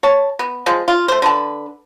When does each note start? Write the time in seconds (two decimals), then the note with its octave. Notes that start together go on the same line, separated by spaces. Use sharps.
0.03 C#5 A5
0.39 B3
0.66 F3 G#3
0.88 F4
1.08 A3 C5
1.22 D3 B4 A5